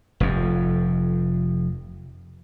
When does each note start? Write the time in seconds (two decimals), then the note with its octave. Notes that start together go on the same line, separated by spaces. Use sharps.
0.20 F1 F2